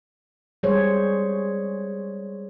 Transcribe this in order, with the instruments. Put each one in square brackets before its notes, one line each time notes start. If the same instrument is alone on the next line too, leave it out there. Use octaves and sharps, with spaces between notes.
[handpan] G3 G#3 G#4 C5 C#5